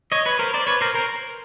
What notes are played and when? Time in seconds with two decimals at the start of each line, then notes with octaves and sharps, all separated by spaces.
0.12 C#5 D#5
0.26 B4 C#5
0.39 A#4 C5
0.54 C5 D5
0.67 B4 C#5
0.81 A#4 C5
0.94 A#4 C5